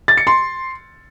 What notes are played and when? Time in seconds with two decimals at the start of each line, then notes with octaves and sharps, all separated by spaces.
0.08 A6
0.17 C#7
0.27 C6